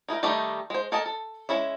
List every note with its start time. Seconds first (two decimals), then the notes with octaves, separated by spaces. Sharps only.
0.08 D#4 E4 G#4 A#4
0.23 D#3 G3 A3 D#4 G4
0.70 G#3 C5
0.92 A4 A#4 D#5 G#5 A5
1.06 A4
1.49 G#3 C#4 E4 E5